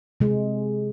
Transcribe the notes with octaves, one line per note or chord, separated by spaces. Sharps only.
C3 G#3 G#4